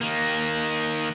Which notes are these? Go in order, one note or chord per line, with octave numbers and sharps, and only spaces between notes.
D#3 A#3